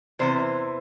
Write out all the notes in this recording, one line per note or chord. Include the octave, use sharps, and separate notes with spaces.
E2 C3 E3 C5